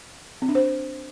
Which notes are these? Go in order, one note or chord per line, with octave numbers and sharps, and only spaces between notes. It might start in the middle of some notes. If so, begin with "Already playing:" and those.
C4
D4
C5